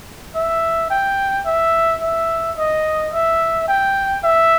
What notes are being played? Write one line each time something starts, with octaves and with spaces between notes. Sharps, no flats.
E5
G5
E5
E5
D#5
E5
G5
E5